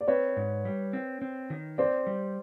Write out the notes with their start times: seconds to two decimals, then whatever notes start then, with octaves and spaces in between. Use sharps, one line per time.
0.01 D5
0.08 C4 B4 C#5
0.37 G#2
0.65 G3
0.93 C4
1.22 C4
1.50 D#3
1.78 C4 C5 D5
2.07 G3